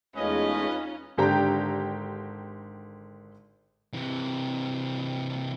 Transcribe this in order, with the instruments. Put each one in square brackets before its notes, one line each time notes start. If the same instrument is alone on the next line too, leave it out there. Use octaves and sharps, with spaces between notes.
[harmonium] E2 G#3 A3 [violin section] C#4 F4 [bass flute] D#4 [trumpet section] B4 D#5
[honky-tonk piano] G#1 D3 G4 G5 A#5
[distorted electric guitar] C3 E3